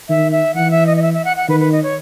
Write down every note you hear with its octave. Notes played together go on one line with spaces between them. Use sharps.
D#3 E5
E5
E3 F#5
E5
D#5
D#5
E5
E5
F#5
F#5
D#3 B4
B4
D#5
C#5